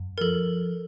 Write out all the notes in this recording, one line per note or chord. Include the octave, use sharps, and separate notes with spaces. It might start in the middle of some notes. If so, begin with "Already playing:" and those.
Already playing: F#2
A#4
F3 A4